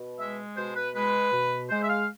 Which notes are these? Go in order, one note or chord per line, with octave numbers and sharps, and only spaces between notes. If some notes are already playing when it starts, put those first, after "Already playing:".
Already playing: B2
G#3 E5
B2 C5
B4
G#3 B4
B2
G#3 C5
E5
F5